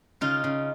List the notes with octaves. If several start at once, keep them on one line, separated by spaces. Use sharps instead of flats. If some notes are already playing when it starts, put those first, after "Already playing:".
C#3 D#4 F4
C#3